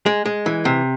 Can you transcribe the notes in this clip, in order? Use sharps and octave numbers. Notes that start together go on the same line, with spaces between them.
G#3
G#3
E3
C3